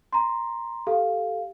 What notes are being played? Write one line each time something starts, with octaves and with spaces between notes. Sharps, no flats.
A#5 C6
G4 A4 F5